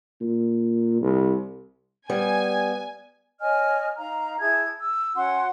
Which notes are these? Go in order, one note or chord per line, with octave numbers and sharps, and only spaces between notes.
A#2
C2
G3 B3 G#5
C#5 D#5 G#5 F6
D#4 F5 A#5
E4 G#4 A5 G#6
E6
C#4 F#4 F#5 C6